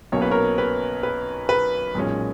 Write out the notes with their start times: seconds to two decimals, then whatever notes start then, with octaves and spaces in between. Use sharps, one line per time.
0.12 B1 B2 A#3 C#4 C#5
0.22 B4
0.31 A#4 C#5
0.58 B4
1.03 B4
1.49 B4
1.95 B1 A#2 G#3 C#4